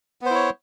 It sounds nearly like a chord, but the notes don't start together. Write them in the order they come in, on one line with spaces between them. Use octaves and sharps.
B3 C5 E4 C#5